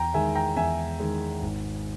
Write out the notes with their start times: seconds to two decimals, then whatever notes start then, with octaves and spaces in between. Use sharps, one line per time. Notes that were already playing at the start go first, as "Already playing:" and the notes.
Already playing: E2 G5 A#5
0.14 D#3 G#3 E5 G#5
0.35 G5 A#5
0.57 E2 E5 G#5
1.00 D#3 G#3
1.42 G#1